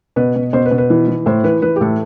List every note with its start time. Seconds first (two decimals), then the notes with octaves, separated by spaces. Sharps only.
0.16 B2 B4
0.36 B2
0.53 B2 C5
0.65 B4
0.71 B2
0.78 B4
0.90 E3
1.08 E3
1.26 A2 C5
1.44 E3 B4
1.62 E3 B4
1.76 G4
1.81 A2 A4